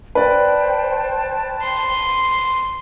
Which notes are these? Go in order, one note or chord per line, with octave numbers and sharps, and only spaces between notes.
B4 C5 D5 G5 A5
C6